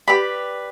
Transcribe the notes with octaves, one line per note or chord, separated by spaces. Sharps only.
G4 B4 D5 B5